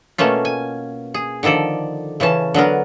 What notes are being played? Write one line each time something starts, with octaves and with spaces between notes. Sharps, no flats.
B2 A3 A#3 C#4 F4
G#5
G#4
D3 D#3 F3 A4 D5
C#3 E3 C#4 A5
D3 F#3 B3 A#4